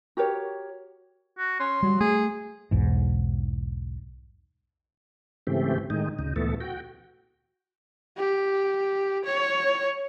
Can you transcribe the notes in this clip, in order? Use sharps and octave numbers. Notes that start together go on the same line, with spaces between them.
F#4 G4 A#4 C#5
F#4
C#4 C6
F#3 G3
A3 G#4
B1 E2 G#2
G#2 C#3 E3 A3 C4 G4
A2 D#3 G#3 D#4
D2 C#3 D#4
D2 A#2 E3 A3 B3 A4
F#4 G5
G4
C#5